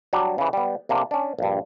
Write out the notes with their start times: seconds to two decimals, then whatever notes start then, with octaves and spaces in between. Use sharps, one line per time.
0.13 F#3 G3 D4 F#4
0.38 C#3 E3
0.53 G3 B3
0.89 C3 A#3 D4
1.11 C#4 D4
1.39 A#1 G2